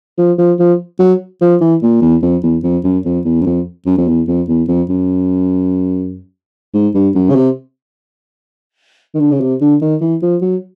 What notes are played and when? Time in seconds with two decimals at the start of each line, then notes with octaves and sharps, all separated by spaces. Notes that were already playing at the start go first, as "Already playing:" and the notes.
0.18 F3
0.38 F3
0.59 F3
0.99 F#3
1.41 F3
1.61 E3
1.82 A#2
2.02 E2
2.22 F2
2.43 E2
2.63 F2
2.84 F#2
3.05 F2
3.25 E2
3.41 F#2
3.46 F2
3.86 F#2
3.97 F2
4.08 E2
4.27 F2
4.48 E2
4.68 F2
4.89 F#2
6.74 G#2
6.95 G2
7.15 F#2
7.30 C#3
7.35 C3
9.15 D#3
9.20 D3
9.31 C#3
9.40 C3
9.61 D3
9.81 D#3
10.01 E3
10.22 F3
10.42 F#3